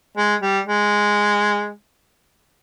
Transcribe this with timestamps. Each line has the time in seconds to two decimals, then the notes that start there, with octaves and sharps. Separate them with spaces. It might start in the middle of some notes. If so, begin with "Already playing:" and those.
0.17 G#3
0.41 G3
0.66 G#3